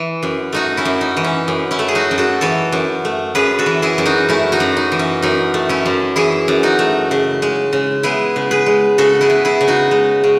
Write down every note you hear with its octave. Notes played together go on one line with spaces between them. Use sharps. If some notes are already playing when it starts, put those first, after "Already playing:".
Already playing: E3
F#2
A3 D#4 F#4
C#4 E4
F#2
D#4
E3
C#4
F#2
C#4 E4
A3
G#4
D#4 F#4
F#2
F#4 A4
E3 A4 C#5
F#2
A3
F#2 G#4 B4
F#4 A4
E3
E4 G#4
F#2
D#4 F#4
A3 C#4 E4
D#4 F#4
F#2
D#4
E3
C#4
F#2 D#4
A3
C#4 E4
F#2
E3 E4 G#4
F#2
D#4 F#4
A3
C#3
G#3
C#3
B3 E4 G#4
C#3
G#4 B4
G#3
C#3 F#4 A4
E4 G#4
B3
E4 G#4
C#3
D#4 F#4
G#3
C#3